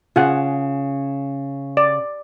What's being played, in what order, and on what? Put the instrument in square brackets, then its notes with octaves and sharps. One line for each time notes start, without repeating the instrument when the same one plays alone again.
[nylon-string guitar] C#3 [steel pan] F4 G#4 F#5
[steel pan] D5